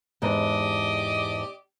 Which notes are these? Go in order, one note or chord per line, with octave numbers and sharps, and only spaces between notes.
E2 G#2 D4 G4 D5 D#5